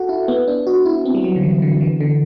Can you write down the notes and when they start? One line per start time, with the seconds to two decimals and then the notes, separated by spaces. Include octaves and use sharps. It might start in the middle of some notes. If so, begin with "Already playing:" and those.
Already playing: F#4 A4
0.09 E4
0.28 B3
0.48 D4
0.67 F#4
0.86 E4
1.05 C4
1.15 G3
1.24 F#3
1.36 D3
1.44 E3
1.62 D3
1.81 E3
2.01 D3